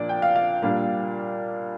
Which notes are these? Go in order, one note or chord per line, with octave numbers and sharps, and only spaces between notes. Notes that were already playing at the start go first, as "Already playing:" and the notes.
Already playing: A#2 F3 A#3 D4 D5
G5
F5
F5
A#2 G3 A#3 D4 F5